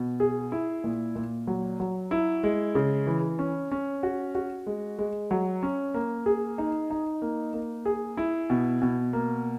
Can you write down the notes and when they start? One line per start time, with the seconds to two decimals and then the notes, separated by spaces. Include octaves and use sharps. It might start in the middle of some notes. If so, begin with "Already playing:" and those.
Already playing: B2
0.20 G#4
0.52 E4
0.84 A#2
1.15 A#2
1.47 F#3
1.80 F#3
2.11 E4
2.43 G#3
2.75 C#3
3.07 E3
3.39 C#4
3.72 C#4
4.03 F#4
4.35 F#4
4.66 G#3
4.99 G#3
5.31 F#3
5.63 C#4
5.94 A#3
6.26 G#4
6.58 D#4
6.90 D#4
7.22 A#3
7.54 A#3
7.85 G#4
8.17 E4
8.50 B2
8.82 B2
9.13 A#3